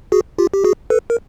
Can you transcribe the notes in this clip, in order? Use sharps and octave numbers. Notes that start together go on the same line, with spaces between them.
F#4 G#4
F4 G4
G4
F#4 G#4
A4 B4
A#4